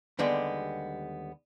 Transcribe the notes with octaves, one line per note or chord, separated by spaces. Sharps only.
D#2 D3 G3 G#3 B3